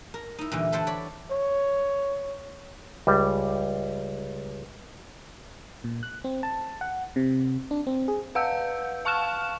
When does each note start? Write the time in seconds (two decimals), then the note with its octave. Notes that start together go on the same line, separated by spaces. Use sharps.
0.14 A#4
0.39 D#4 E4
0.52 A#2 D3 E3 G3
0.72 A4 B4 C5 F#5 G5 A5
0.87 C#5 D5 B5
1.31 C#5
3.07 C#2 G3
5.84 A#2
6.03 F#6
6.24 C4
6.43 A5
6.81 F#5
7.16 C3
7.71 D4
7.87 C4
8.08 G#4
8.35 B4 F5 F#5 E6 G6
9.05 F5 A5 C#6 F6 F#6 E7